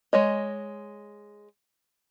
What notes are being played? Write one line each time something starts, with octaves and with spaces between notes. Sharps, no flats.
G#3 C#5 D#5